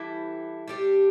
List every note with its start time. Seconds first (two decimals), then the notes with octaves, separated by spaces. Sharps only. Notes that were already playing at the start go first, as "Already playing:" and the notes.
Already playing: E3 G3 E4 A4
0.68 G3 D4 G4